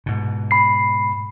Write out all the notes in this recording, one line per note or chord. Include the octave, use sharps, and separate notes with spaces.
G#2 B2
B5 C7